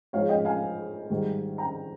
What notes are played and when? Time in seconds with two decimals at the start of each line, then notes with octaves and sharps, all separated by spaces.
0.13 G#2 F3 G#3 C#5 F5
0.29 D#5 G5
0.45 F5 G#5
1.10 G#2 D#3 G3
1.58 G5 A#5